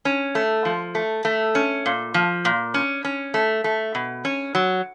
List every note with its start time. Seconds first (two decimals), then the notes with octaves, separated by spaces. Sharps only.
0.05 C#4
0.35 A3
0.65 F3
0.95 A3
1.25 A3
1.55 C#4
1.86 A#2
2.14 F3
2.45 A#2
2.74 C#4
3.05 C#4
3.34 A3
3.64 A3
3.95 B2
4.25 C#4
4.55 F#3